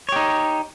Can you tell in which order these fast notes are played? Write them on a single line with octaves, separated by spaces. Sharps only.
C#5 G4 D#4